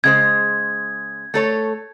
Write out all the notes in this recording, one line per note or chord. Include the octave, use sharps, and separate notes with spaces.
C#3 G#3 C5 G#6
A3 A4 C#5